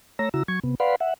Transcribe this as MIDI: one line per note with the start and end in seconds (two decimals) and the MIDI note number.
0.19 0.29 57
0.19 0.29 73
0.19 0.29 82
0.19 0.29 88
0.19 0.29 94
0.34 0.43 49
0.34 0.43 64
0.34 0.43 66
0.34 0.43 82
0.34 0.43 88
0.48 0.60 54
0.48 0.60 85
0.48 0.60 92
0.64 0.75 48
0.64 0.75 59
0.80 0.96 71
0.80 0.96 74
0.80 0.96 77
0.80 0.96 78
0.80 0.96 83
0.80 0.96 84
1.00 1.14 76
1.00 1.14 78